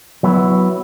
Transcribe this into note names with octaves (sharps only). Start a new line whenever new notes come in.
F#3 B3 E4